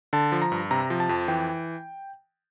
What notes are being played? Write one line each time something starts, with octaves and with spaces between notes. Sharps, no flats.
D3 A5
F3
A#5
G2
C3 A#5
F3
A5
F2
E3 G5